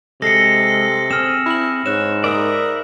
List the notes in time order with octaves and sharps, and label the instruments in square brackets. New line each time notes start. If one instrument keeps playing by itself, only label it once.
[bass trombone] C3 [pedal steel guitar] G#3 [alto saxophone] A4 [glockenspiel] A#6 C7 C#7
[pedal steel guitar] C4 G#4 [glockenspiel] E6 F6 E7
[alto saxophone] E4 [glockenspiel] B5 F#7
[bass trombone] G#2 [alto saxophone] C#5 [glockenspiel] F#6 E7
[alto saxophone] A#4 [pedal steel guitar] D5 E5 D#6